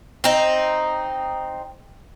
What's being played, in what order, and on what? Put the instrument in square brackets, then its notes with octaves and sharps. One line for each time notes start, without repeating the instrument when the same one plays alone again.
[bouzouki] C4 D#4